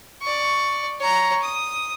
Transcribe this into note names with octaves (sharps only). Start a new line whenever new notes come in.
D5 C#6
C#5 A#5
D#6